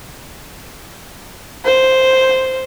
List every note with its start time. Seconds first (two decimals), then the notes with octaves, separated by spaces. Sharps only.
1.65 C5